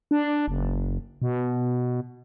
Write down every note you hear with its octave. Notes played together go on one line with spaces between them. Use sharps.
D4
F#1
B2